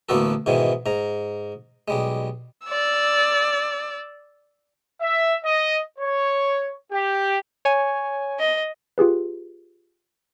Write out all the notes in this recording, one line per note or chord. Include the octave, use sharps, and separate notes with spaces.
A1 D2 A#3 B3 F#4 A4
G#2 B2 D#3 E3 G#3
G#2 A#5
B1 G3 G#3
D5 E6
E5
D#5
C#5
G4
C#5 G#5
D#5
F4 G4 G#4 B4